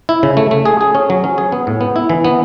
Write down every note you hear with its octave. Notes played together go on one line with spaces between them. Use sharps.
E4
C#3
A3
A3
G#4
G#4
C#4
F#3
C#4
G#4
B3
A2
B3
E4
E3
B3